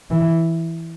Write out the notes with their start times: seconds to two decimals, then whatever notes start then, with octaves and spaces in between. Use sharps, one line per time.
0.11 E3